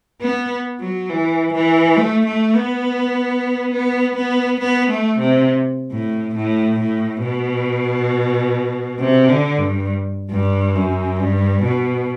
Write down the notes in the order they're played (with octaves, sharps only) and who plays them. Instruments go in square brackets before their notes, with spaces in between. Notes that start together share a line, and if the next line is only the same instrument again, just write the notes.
[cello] B3
F#3
E3
E3
A3
A3
B3
B3
B3
B3
A3
C3
A2
A2
A2
B2
C3
D3
G2
G2
F#2
G2
B2